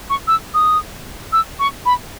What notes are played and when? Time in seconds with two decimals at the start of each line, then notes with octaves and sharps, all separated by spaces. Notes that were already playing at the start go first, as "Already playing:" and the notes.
0.10 C#6
0.27 E6
0.54 D#6
1.32 E6
1.59 C#6
1.85 B5